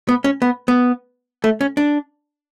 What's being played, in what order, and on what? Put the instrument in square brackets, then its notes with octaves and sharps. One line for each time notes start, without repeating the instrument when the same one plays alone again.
[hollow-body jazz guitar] B3
C#4
B3
B3
A3
C#4
D4